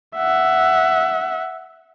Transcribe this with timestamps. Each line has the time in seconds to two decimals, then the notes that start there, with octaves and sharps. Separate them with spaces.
0.17 E5 F#5